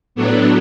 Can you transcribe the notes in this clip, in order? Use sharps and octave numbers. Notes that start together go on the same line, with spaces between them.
A2 F#3 A3 B3 D4